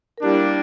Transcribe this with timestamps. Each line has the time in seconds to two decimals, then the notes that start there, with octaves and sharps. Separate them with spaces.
0.18 A#4
0.22 G3 A#3 D4 E4 G4